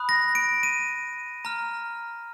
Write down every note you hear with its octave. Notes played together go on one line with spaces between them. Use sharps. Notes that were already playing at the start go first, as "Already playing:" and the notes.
Already playing: B5 D#6 F#6
A#6
D7
D#7
A#5 F6